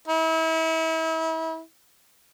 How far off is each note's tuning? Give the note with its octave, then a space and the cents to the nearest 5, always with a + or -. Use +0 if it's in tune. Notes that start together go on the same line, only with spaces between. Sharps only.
E4 -35